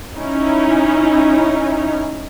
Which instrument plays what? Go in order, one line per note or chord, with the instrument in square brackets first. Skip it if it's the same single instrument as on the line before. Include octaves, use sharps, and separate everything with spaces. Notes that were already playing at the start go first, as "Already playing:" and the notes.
[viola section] C#4 D#4 E4